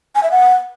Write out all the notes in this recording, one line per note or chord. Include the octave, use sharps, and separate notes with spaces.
G#5
E5
F#5